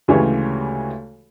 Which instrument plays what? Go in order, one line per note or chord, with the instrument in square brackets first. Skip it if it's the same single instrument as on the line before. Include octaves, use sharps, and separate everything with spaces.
[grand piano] D2 C#3 E3 G#3 G4 C#5